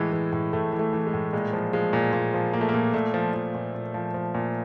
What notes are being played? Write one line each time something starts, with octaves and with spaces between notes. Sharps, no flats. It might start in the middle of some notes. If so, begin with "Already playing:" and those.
Already playing: A2 E3 G#3
E3
A2
A2 A3
E3
A3
E3
G#3
A2
A#2 G#3
F3
F3 G#3
A#2
A#2
F3
F3 A#3
A3
A#2 A#3
A#2 A3
F3
F3
A#2
A#2
F3
F3
A#2